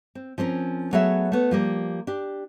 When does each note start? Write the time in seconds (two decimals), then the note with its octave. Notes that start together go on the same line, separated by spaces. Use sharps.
0.15 C4
0.38 F3 C4 C#4 A#4
0.93 F#3 A3 B3 G#4 C#5 E5
1.32 A3 B3 C#5
1.51 F3 G3 A#3
2.07 D4 G4